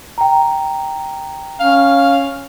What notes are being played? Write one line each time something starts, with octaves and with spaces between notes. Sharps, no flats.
G5 A#5
C#4 F5